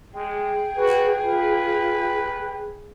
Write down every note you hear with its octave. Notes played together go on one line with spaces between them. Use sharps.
G#3 G#4 G5
F#4 B4
F4 B4